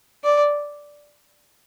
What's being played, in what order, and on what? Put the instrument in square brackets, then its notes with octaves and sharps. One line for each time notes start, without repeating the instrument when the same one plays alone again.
[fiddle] D5